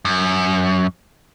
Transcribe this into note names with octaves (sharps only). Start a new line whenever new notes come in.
F#2